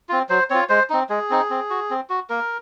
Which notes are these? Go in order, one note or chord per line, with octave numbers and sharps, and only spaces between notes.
C4 F4
F#3 C5
C4 F4 C#5
G#3 C5
C4 D#4
G#3 G#4
C4 D#4
C4
F#4
C4
F#4
A#3 A#4